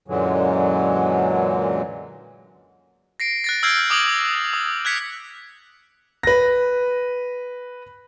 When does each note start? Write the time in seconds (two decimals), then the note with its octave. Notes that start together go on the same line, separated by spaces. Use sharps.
0.08 F#2 A#2 D3 E3 F#3 G#3
3.20 A#6 C7 D7
3.44 F#6 A6 A#6
3.63 E6 F6 G6 G#6 C7 D7
3.90 D6 D#6 D7 F#7
4.53 D#6
4.85 F#6 G#6 B6 C#7
6.23 B4 A#6